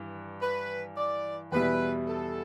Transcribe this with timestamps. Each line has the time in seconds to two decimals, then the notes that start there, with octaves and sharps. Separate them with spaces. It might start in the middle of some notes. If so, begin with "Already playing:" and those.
Already playing: G2 E3
0.42 B4
0.97 D5
1.52 E2 B2 G3 E4 B4
2.07 A4